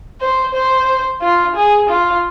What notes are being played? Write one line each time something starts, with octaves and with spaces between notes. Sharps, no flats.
C5
C5
F4
G#4
F4